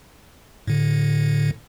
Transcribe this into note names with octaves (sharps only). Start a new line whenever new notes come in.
A2 D3